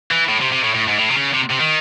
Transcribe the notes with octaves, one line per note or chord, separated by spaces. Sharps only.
E3
A2
C3
C3
A2
A2
G#2
A2
C3
C#3
C3
C3
D#3